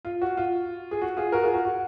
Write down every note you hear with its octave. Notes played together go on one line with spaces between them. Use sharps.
F4
F#4
F4
G#4
F#4
F4 G#4
F#4 A#4
F4 G#4
F#4
F#4